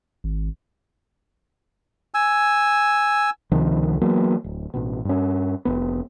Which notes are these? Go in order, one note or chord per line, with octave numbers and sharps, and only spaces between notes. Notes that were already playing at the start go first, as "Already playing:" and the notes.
G#1
G#5 E6
C#2 C3 D#3 F3
E3 F#3 A#3 B3
D1
A1 B2
G2 C#4
F1 B3